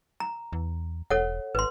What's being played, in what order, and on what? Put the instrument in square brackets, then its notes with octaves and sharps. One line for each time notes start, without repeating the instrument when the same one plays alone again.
[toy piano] A#5
[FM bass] E2
[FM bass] E1 [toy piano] A4 C#5 F#5
[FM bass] G#1 [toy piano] B4 C6